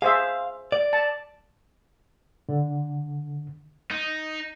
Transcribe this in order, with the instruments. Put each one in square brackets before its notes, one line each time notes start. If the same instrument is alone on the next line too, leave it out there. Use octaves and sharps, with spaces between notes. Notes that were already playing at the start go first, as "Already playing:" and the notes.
[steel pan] G#4 C5 E5 [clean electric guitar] F5
[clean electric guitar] D5
[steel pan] A5
[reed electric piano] D3
[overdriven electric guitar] D#4